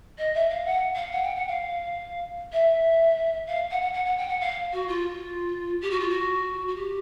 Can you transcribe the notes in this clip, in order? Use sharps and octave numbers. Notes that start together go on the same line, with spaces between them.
D#5
E5
F5
F#5
F5
F#5
G5
F#5
F5
E5
F5
F#5
F#5
F#5
F#5
G5
F#5
F5
F#4
F4
G4
F#4
F4
F#4
F#4
G4